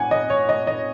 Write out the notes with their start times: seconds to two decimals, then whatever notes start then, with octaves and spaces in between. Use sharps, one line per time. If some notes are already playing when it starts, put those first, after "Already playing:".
Already playing: F#5 G#5
0.11 D#5
0.30 C#5
0.49 D#5
0.67 D#5